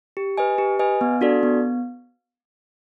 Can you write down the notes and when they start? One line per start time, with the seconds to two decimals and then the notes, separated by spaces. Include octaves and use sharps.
0.17 G4
0.37 B4 D#5 G#5
0.58 G4
0.79 B4 D#5 G#5
1.01 B3
1.21 D4 F#4 A4 D5
1.43 B3